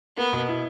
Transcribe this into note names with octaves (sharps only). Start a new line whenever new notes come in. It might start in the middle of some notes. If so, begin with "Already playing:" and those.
A#3 B3
B2
E4